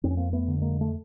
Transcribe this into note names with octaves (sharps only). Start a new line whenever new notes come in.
F2 C4
C#4
A#3 C4
A3 B3
D3
G#3 A#3
A3